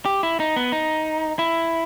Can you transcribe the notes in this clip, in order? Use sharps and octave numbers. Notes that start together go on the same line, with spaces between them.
G4
E4
D#4
B3
D#4
E4